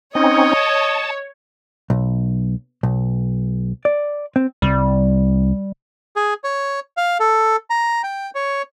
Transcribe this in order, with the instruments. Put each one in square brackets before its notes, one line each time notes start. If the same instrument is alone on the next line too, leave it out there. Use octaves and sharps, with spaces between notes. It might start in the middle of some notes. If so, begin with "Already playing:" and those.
[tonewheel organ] C4 C#4 D#4 [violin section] C#5 [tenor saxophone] D#5
[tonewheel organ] A5
[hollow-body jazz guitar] B1
B1
D5
C4
[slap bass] C2 [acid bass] G3
[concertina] G#4
C#5
F5
A4
A#5
G5
C#5